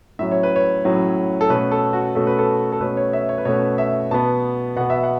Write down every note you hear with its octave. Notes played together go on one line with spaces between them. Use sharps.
A2 F#3 C#4 E5
C#5
B4
C#5
A2 F#3 C#4
A4
B2 A3 C#4 B4
A4
F#4
B2 A3 C#4 A4
B4
A4
A4
B2 A3 C#4 B4
C#5
E5
C#5
B4
B2 A3 C#4 C#5
E5
B2 B3 A5
B2 B3 F#5
E5
F#5